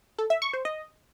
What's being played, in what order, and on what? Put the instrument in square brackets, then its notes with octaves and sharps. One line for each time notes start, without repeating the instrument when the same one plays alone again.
[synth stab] A4
E5
C#6
C5
D#5